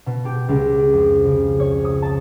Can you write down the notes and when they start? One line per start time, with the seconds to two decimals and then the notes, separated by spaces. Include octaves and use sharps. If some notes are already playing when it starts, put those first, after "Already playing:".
0.06 B2
0.25 G4
0.49 C#2
0.93 F2
1.25 C#3
1.60 C#5
1.85 D#6
2.02 A5